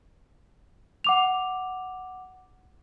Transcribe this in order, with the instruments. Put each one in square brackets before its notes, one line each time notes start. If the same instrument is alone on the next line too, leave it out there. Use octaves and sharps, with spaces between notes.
[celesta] F#5 D6 F7